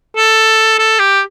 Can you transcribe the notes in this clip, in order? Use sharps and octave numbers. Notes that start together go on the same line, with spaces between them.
A4
A4
G4